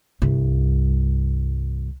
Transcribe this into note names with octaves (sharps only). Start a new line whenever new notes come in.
C2 G2